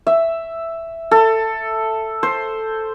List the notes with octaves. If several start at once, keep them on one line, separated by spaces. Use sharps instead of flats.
E5
A4
C5